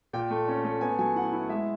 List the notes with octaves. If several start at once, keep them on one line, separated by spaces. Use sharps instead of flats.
A#2 G5
A3
C#4
A3
B3 G#5
F#3 G#5
E4 F#5
E4
G#3 E5